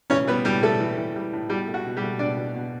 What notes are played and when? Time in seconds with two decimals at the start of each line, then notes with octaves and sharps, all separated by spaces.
0.10 E3 C#4 C#5
0.27 G3 B3 B4
0.45 A2 G3 G4
0.63 G3 A3 A4
0.80 E3
0.97 E3
1.16 G3
1.33 A2
1.49 B2 G3 G4
1.67 A3
1.74 F#4
1.85 B2
1.97 G3 G4
2.03 A3
2.19 B2 D4 D5
2.37 B2
2.55 B2